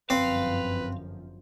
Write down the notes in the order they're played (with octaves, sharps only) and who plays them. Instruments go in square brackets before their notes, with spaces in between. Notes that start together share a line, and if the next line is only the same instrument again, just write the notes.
[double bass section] G1 F#2 F3 [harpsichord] C4 [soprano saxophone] B4 [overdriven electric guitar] F5